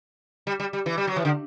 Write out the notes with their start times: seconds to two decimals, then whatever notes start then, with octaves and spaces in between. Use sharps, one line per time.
0.47 G3
0.60 G3
0.73 G3
0.86 E3
0.97 G3
1.07 F#3
1.16 E3
1.25 D3